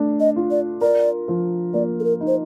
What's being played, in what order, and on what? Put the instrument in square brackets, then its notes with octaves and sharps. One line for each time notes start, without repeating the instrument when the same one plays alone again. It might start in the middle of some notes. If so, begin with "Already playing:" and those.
Already playing: [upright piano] A3 D4
[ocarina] D#5
[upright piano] F4
[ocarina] D5
[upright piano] A#4 [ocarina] D5
[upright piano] F3
[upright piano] A#3 [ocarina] D5
[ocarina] A4
A#4
[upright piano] D#4
[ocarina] C5